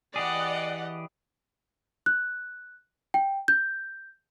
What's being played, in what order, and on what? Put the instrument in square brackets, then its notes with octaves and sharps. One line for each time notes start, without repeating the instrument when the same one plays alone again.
[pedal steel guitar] E3 G4 G#4 [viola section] D5 D#5 F#5
[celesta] F#6
G5
G6